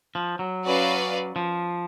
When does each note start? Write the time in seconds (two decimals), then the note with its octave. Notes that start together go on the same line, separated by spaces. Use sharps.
0.15 F3
0.39 F#3
0.64 C#4 F#4 B4 D5 F5
1.36 F3